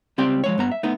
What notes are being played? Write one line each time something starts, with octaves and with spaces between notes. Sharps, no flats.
C#2 G3 C4 D5 G5
F3 G#3 C#5
G2 B3 A#5
E5
A3 B3 D#4